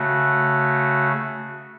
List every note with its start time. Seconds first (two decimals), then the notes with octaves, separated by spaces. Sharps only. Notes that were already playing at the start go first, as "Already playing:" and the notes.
Already playing: C#3 A3 F#4